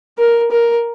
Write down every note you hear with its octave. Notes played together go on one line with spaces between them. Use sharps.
A#4
A#4